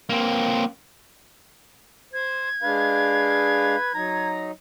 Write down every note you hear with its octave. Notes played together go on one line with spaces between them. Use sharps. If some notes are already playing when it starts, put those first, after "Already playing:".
A#3 C4
C5 G#6
G#3 D4 B4 F5
F#3 D#4 A#5